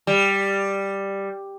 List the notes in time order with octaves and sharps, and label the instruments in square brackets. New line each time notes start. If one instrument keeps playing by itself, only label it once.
[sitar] G3